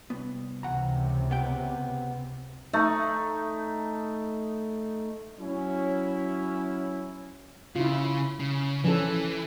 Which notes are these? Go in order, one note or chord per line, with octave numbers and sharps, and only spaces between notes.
C2 B3
C#2 C3 E3 F#5 A#5
B3 G5
A3 D#4
F#3 C#4 E4
C#3 E4 F4
C#3
E3 F3 C#4 A4